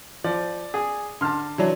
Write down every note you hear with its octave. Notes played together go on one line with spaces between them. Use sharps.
F3 D5
G#4
D3 A5 C6 F6
E3 F#3 D4